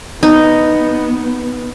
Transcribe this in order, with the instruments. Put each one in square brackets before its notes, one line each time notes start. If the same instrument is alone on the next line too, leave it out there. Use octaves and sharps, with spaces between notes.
[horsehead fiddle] B3 [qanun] D#4